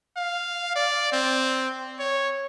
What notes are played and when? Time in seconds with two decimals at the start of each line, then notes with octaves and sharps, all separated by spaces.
0.17 F5
0.76 D5
1.12 C4
1.99 C#5